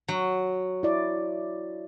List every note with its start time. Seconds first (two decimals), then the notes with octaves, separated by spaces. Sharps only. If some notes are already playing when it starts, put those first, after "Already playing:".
0.08 F#3
0.83 E4 D5